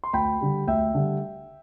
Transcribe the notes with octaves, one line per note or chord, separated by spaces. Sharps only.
C6
D2 G5 B5
D3 G3
D2 E5 G5
D3 G3